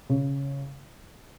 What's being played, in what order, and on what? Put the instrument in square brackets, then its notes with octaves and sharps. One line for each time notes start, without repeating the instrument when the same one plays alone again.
[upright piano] C#3